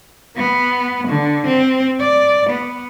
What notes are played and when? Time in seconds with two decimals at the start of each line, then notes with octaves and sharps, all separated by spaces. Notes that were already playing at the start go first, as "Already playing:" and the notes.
0.36 B3
1.08 D3
1.47 C4
2.01 D5
2.49 B3